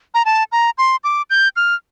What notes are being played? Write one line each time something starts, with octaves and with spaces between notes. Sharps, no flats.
A#5
A5
A#5
C6
D6
G6
F6